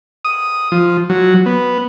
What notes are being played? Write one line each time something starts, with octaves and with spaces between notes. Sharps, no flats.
D#6
F3
F#3
B3